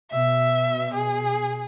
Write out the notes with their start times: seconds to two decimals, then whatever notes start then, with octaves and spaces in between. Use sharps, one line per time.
0.11 B2 E5
0.94 G#4